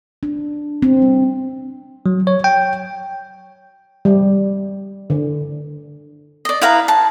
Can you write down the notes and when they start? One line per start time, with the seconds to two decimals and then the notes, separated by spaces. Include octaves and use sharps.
0.23 D4
0.82 C4
1.02 G3
2.06 F#3
2.27 C#5
2.44 G5
4.05 G3
5.10 D3
6.45 D5 D#5
6.61 E4 B4 F5 A#5
6.88 A5